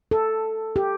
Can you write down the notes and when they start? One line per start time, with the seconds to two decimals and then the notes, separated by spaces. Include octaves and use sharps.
0.11 A4
0.76 G4